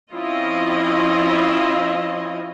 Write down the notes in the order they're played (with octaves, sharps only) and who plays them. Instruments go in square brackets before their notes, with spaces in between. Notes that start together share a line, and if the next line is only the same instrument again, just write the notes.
[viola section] F3 C4 C#4 E4 F4 D#5